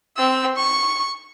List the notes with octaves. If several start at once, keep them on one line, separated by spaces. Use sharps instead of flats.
C4 E6
C#6